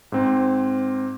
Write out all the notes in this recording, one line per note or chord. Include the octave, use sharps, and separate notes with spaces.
G#2 C4